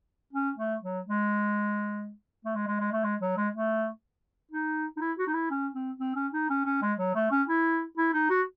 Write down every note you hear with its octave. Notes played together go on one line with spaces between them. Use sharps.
C#4
A3
F#3
G#3
A3
G#3
G#3
G#3
A3
G#3
F#3
G#3
A3
D#4
D#4
E4
F#4
D#4
E4
C#4
C4
C4
C#4
D#4
C#4
C#4
G#3
F#3
A3
C#4
E4
E4
D#4
F#4